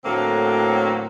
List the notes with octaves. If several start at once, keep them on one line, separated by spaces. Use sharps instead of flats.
A2 D3 F#3 A3 A#3 C4